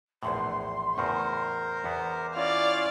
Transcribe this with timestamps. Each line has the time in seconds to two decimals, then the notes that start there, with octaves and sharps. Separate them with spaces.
0.23 A#1 E2 A2 C6
0.98 E2 A2 C#3 A#4 C5
1.84 E2 B3 D6
2.36 C#4 E4 F4 D5 F5